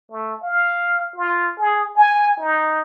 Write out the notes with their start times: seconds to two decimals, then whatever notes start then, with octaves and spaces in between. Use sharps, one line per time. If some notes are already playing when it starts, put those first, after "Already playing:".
0.11 A3
0.43 F5
1.16 F4
1.59 G#4
1.96 G#5
2.39 D#4